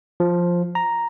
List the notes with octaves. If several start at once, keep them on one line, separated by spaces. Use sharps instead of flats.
F3
A#5